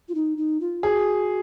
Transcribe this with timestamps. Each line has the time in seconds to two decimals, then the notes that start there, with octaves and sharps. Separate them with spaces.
0.09 F4
0.15 D#4
0.37 D#4
0.61 F4
0.83 F#4 G#4